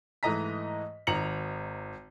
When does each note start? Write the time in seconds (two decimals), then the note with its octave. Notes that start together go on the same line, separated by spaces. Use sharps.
0.23 G#2 E3 A3 D#5 A#5 B6
1.07 G#1 D#4 A#5 C#7 F7 F#7